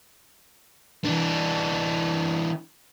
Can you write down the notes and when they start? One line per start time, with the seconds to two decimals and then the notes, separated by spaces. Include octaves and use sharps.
1.05 E3 D4